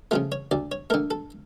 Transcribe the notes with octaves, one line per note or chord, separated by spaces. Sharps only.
C#3 F3 A3 F4
C#5
D2 D5
C#5
D3 A3 A#4
A4